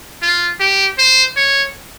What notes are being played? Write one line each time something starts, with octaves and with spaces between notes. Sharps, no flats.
F4
G4
C5
C#5